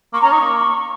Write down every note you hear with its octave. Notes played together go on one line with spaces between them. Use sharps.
A#3 C#6
C#4 A#5
D#4 C#6
A#3